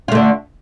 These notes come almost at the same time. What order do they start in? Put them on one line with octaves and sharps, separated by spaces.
F4 A3 D3